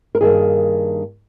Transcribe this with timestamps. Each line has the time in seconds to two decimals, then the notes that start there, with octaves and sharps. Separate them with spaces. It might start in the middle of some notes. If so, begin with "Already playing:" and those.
0.15 A#4
0.21 G2 D#3 A#3 G#4